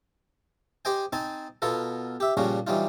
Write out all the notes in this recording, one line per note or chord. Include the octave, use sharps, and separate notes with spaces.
G4 C5 D#5 G5 G#5
C4 D#4 G#5 A5
B2 B3 F4 A4 A#4
G4 E5
A#2 C#3 F3 G3 C#4 F#4
E3 F#3 G3 D#4 F4